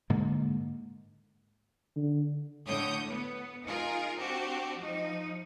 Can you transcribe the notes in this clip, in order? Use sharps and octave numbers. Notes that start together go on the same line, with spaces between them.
G#2 D3 A#3
D3
A2 D3 C#5 D#6 G6
B3
D#4 F4 G#4 A#4
C4 D4 F#4 G4
F3 D#4